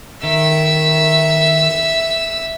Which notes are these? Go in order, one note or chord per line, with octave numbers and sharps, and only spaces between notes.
D#3 E5 E6